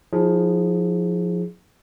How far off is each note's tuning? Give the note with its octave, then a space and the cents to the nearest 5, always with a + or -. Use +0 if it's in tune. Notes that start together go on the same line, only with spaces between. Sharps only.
F3 +20 E4 -30 G#4 +0